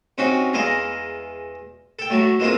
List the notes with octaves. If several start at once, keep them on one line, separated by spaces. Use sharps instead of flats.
C3 C#4 D#4 F#4
E2 E3 G#3 D#5 F5 A#5
A4 G5
A2 F#3 A3
E3 G#3 A#3 C4 F4